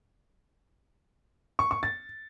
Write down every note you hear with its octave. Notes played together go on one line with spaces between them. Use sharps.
C#6
C#6
A6